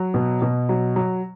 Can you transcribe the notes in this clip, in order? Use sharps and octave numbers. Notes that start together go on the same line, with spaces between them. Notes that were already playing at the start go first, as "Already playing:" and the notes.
Already playing: F#3
B2
B2
F#3
F#3